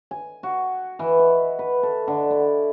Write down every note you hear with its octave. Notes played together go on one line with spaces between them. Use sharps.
G#5
F#4
E3
D#5
B4
A4
D3
E4